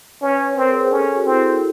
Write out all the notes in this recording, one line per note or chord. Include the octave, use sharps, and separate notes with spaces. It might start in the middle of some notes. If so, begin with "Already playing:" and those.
C#4 B4 C#5
C4 A#4 C5
G#4 A#4
G#4 A#4
C#4 G4 A4
G4 A4
F#4 G#4
C4 E4